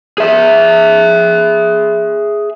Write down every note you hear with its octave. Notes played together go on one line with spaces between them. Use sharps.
G#4 E5